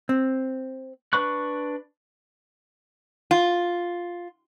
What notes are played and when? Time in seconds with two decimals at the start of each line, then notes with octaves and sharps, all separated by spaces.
0.09 C4
1.13 D4 B4 B5 C#6 F#6
3.31 F4